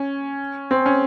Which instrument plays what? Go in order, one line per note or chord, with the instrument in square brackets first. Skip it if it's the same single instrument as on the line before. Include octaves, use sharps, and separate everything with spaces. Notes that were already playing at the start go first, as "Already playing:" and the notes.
Already playing: [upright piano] C#4
C4
C#4